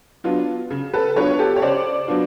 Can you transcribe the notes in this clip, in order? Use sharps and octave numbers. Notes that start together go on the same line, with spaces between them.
F#3 B3 D4 F4
C#3
A4 B4
F#3 B3 D4 F4 B4 C#5
G4 A4
C#5
C#3 C5 D5
F#3 B3 D4 F4